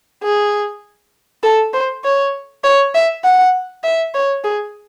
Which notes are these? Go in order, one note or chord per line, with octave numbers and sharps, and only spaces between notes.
G#4
A4
C5
C#5
C#5
E5
F#5
E5
C#5
G#4